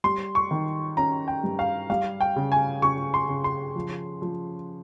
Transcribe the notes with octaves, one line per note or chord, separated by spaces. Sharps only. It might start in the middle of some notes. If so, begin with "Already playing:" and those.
G3 C6
C#6
D#3
C#4 A#5
G5
G2
F5
G3 F5
G5
C#3
G#5
C#3 C#6
C6
C#3
C6
F3
F3